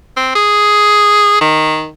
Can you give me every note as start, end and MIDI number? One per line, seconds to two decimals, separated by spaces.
0.16 0.35 60
0.35 1.40 68
1.41 1.89 51